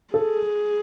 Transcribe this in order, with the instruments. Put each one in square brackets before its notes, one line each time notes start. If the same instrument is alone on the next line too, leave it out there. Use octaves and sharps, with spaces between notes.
[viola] G#4 [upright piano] A4